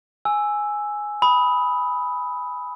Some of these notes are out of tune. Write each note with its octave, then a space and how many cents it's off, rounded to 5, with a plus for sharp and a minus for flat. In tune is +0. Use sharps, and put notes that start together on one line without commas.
G#5 +0 E6 +0
B5 +0 D#6 +20